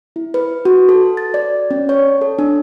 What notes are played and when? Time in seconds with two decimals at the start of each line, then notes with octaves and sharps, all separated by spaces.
0.16 E4
0.34 B4
0.65 F#4
0.89 A4
1.17 A6
1.34 D5
1.71 C#4
1.89 C#5
2.21 A4
2.39 D4